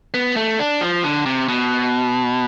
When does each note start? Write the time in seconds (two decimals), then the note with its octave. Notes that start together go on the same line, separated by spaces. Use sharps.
0.14 B3
0.36 A3
0.59 D4
0.81 F3
1.04 D3
1.26 C3
1.48 B2